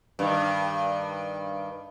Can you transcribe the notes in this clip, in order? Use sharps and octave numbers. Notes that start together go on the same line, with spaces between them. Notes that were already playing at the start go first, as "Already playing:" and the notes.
G2 D#3